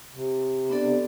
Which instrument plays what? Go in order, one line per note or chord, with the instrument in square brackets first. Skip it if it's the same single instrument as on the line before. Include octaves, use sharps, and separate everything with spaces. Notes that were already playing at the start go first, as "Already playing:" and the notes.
[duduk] C3
[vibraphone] B3 D4 A4 D5